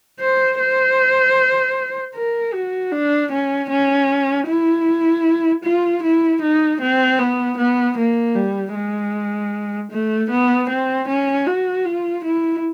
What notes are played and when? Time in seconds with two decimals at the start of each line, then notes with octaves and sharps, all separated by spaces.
0.20 C5
0.59 C5
2.15 A#4
2.53 F#4
2.92 D4
3.32 C#4
3.70 C#4
4.47 E4
5.64 F4
6.03 E4
6.42 D#4
6.80 C4
7.19 B3
7.58 B3
7.97 A#3
8.35 G3
8.75 G#3
9.91 A3
10.30 B3
10.69 C4
11.08 C#4
11.47 F#4
11.85 F4
12.24 E4